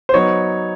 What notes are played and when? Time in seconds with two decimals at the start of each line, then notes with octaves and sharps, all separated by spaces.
0.09 C5
0.14 F#3 B3 D#4 C#5